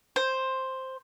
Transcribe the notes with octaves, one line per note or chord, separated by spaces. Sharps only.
C5